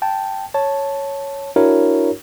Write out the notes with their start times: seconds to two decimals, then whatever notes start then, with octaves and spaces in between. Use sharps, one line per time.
0.02 G5 A5
0.54 C#5 A5
1.56 D4 E4 F#4 A#4 C#5